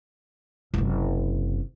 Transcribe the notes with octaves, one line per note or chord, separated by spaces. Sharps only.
F#1 C3